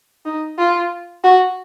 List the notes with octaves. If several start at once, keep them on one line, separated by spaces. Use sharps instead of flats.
D#4
F4
F#4